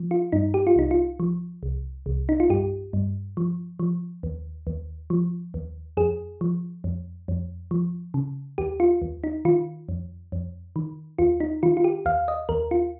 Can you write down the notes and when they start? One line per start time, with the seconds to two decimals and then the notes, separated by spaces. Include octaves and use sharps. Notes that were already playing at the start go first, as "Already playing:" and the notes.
Already playing: F3
0.11 F4
0.32 G2 D#4
0.54 G4
0.67 F4
0.76 C2 D#4
0.91 F4
1.20 F3
1.63 C2
2.06 C2
2.29 D#4
2.40 F4
2.50 G2 G4
2.93 G2
3.37 F3
3.80 F3
4.23 D#2
4.67 D#2
5.10 F3
5.54 D#2
5.97 F2 G#4
6.41 F3
6.84 F2
7.28 F2
7.71 F3
8.14 C#3
8.58 D#2 G4
8.80 F4
9.02 D#2
9.24 D#4
9.45 D#3 F4
9.89 F2
10.32 F2
10.76 D#3
11.18 D#2 F4
11.40 D#4
11.63 D#3 F4
11.77 F4
11.84 G4
12.06 D#2 F5
12.28 D#5
12.49 D#2 A#4
12.71 F4